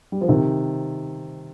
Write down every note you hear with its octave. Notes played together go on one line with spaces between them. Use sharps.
G3
F3
C3 D#3